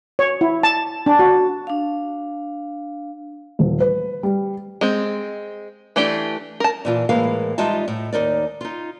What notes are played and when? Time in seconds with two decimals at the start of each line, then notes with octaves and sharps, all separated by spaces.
0.19 C#5
0.41 E4
0.63 A5
1.06 D4
1.19 F#4
1.67 D4 F5
3.59 D#1
3.80 B4
4.23 G3
4.81 G#3 C4
5.96 E3 A3 D4 G4
6.60 A#4 A5
6.85 A#2 E3 F4
7.09 A2 E3 G#3 A#3 F5
7.58 G3 G#3 D#4 F4 E5 A5
7.88 A2
8.13 D#2 D#4 A#4 D5
8.61 D#4 F4